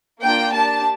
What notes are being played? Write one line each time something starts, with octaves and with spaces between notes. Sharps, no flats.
A#3 D4 F4 G5
D4 G4 A5